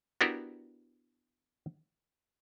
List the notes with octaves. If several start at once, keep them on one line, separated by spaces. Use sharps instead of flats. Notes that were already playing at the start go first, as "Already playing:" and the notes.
B3 D4 E4 F#4 G4 A#4